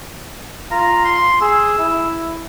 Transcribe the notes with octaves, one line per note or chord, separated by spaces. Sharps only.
F4 A#5
C6
G#4 E6
E4